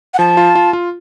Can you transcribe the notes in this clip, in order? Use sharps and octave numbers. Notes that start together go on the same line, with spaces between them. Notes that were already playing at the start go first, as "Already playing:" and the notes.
F#5
F3 A5
F4
F4
F4